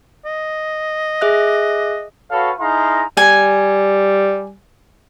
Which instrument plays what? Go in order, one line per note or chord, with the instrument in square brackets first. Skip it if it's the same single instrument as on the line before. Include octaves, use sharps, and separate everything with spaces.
[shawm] D#5
[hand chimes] G#4 E5 F#6
[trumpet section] F#4 A4 B4 C#5 F5
D#4 E4 G#4 F5 A#5 C6
[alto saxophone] G3 [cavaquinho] G#5